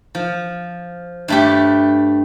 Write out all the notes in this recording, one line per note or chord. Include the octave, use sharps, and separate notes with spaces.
F3
G2 A3 G4